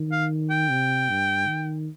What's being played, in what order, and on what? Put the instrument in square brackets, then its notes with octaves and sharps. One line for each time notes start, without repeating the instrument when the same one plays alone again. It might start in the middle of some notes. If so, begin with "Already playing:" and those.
Already playing: [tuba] D#3
[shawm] F5
G5
[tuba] C3
G2
D#3